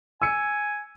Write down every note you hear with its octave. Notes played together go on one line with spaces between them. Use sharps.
G#5 E6 C#7